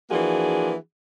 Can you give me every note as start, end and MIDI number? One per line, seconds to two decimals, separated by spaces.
0.11 0.75 52
0.11 0.75 53
0.11 0.75 58
0.11 0.75 62
0.11 0.75 66
0.11 0.75 68